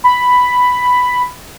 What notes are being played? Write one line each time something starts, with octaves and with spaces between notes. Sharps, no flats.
B5